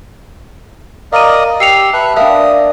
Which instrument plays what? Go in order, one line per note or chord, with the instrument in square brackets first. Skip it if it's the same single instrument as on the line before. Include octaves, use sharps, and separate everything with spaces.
[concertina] A#4 D5 D#5 [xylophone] F5 D#7
[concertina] G4 E6 [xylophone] C7 C#7 F7
[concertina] B4 E5 F#6 [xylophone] A5
[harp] D4 A#4 [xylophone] E5 F5 G5 [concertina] D#6